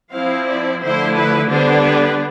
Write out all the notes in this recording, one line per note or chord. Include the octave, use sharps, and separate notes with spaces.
F3 C4 E4 F5
D5
D3 F3 A3 E4 C5
B4
D3 G3 B3 D4 C5
B4